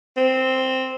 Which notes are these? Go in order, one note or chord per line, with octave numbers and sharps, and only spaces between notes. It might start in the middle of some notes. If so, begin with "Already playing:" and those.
C4